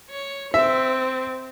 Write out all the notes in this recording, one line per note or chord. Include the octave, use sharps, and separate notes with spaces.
C#5
C4 E5